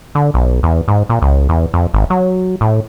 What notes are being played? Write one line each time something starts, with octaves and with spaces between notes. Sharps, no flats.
D3
B1
E2
G#2
A#2
C#2
E2
F2
G#1
F#3
A2